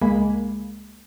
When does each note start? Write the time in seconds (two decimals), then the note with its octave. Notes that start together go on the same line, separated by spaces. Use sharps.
0.01 C#2 G#3 A#3 G#5 B5